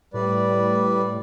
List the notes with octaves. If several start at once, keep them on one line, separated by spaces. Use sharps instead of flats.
A2 G3 B4 D5